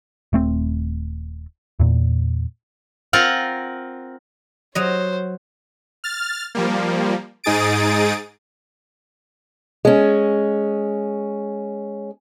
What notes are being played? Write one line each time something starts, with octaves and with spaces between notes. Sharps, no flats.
D#1 A3 C4
E2 A#2
C4 F4 A#4 F#5
F#3 C5 C#5 D#5
F6 A6
F3 G3 A#3
G#2 D#4 G#4 D#6 A6 D7
G#3 C#4